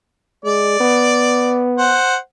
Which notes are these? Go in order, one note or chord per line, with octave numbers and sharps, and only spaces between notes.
G#3 D5
B3
C5 F#5